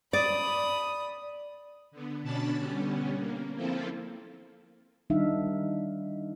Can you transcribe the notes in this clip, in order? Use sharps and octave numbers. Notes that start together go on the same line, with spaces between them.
D5 B5 D#6
D3 B3
B2 C#4 D4 A5 B5 A6
D3 G3 B3 C#4
A#3
F3 A#3 C4 E4 F4 A4
D#3 G3 D4 D#4 E5 F5